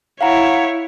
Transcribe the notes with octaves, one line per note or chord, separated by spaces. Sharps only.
E4 C#5 F5 F#5 A#5